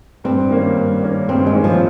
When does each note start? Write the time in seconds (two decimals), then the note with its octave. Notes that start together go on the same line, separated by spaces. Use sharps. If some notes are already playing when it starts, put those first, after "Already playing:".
0.24 G2 C4
0.50 D#3 A#3 C#4
0.77 G2
1.03 D#3 A#3 C#4
1.29 G2 C4
1.46 G#3
1.55 D#3 A#3 C#4
1.64 F3